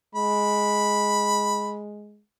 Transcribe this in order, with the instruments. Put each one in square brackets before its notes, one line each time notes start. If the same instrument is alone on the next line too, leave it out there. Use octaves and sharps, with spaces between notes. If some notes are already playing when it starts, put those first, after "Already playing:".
[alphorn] G#3 [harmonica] B5